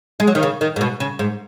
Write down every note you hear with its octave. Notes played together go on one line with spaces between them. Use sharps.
G#3
F#3
D#3
C#3
D#3
G#2
B2
C#3
G#2